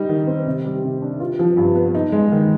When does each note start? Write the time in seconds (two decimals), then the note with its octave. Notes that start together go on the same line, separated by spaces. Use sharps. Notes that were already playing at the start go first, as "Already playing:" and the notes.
Already playing: G3 D#4
0.09 D#3
0.27 C4
0.46 C3
0.65 G3
0.84 C3
1.02 D4
1.20 F4
1.39 F3
1.57 G2
1.76 B3
1.95 D#4
2.12 G#3
2.32 D#3